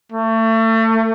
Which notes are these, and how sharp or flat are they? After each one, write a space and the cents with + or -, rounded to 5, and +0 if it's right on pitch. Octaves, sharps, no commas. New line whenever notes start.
A3 +30